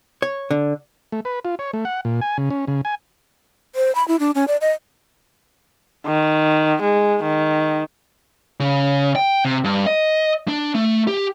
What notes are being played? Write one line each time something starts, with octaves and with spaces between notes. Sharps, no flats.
C#5
D3
A3
B4
F4
C#5
A3
F#5
A#2
G#5
C#3
C#4
C#3
G#5
C5
B5
E4
D4
C#4
D5
D#5
D#3
G#3
D#3
C#3
G5
C3
G2
D#5
D4
A3
G4